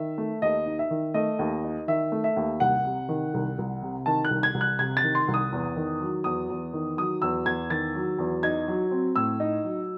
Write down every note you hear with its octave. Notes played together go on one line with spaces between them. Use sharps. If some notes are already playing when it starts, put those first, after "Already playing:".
Already playing: D#3 E5
A3
D#2 D#5
D#4
E5
D#3
A3 D#5
D#2
D#4
D#3 E5
A3
E5
D#2
C2 F#5
C3
D#3
C2
C2
C3
D#3 A5
F#6
C2
G#6
C2
F#6
C3 G#6
A6
D#3
C6
C2
D#6
E2
D#3
F#3
E2 D#6
E2
D#3
F#3 D#6
E2 E6
E2 G#6
D#3 A6
F#3
E2
D#4 G#6
F#3
C4
A2 E6
D#4
F#3